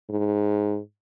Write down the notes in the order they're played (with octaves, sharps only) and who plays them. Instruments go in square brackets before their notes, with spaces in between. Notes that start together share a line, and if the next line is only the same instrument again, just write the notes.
[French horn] G#2